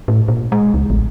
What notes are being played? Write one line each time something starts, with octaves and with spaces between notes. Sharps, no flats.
A2
A#2
G#3
C#2
A1